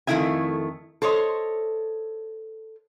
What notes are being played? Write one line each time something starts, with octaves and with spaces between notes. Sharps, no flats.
F2 D#3 A3 E4 E5 G#5
A4 C5 C#5 D#5